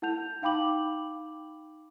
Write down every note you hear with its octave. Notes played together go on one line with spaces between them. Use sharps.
E4 F#5 A5 G6 F7
D#4 F5 G5 B5 D6 F#7